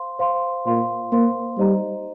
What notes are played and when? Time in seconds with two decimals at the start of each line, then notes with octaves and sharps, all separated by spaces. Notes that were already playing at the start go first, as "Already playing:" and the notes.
Already playing: C5 F5 C6
0.19 C5 F5 C6
0.65 A#2 C5 F5 C6
1.12 A#3 C5 F5 C6
1.58 G3 D#4 C5 D#5 A#5